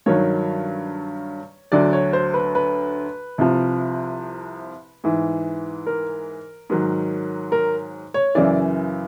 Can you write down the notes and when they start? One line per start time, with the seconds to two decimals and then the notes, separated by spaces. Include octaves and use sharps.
0.06 G2 D#3 F#3 C#5
1.72 D2 D3 F#3 D5
1.93 C#5
2.13 C5
2.34 B4
2.55 B4
3.38 C2 C3 F3
5.04 G#2 E3
5.86 A#4
6.70 G#2 D#3 F#3
7.52 A#4
8.14 C#5
8.35 F#2 C#3 E3 D5